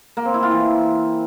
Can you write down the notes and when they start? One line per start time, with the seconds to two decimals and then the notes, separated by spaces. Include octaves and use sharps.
0.17 A#3
0.25 C4
0.34 E4
0.43 F4
0.51 E3